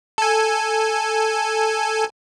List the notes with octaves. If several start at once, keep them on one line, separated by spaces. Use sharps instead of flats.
A4 G#5